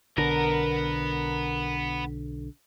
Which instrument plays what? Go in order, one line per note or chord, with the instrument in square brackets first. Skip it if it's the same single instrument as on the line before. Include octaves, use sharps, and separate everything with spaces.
[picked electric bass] B1 D3 [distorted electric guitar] B3 B4 [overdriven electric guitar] A#4